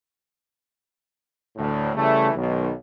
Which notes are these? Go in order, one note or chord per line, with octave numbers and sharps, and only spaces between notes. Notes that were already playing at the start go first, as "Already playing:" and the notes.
D2 A2
C#3 E3 G3 A3
B1 D#3